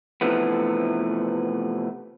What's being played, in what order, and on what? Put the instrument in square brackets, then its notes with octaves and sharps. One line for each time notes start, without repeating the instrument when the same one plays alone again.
[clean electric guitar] C3 E3 F3 A3 B3